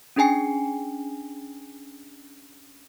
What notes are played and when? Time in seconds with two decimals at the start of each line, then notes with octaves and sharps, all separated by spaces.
0.16 C#4 D4 G#4 G5 G#5 C7